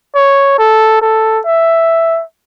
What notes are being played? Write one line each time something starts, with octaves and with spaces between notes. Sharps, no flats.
C#5
A4
A4
E5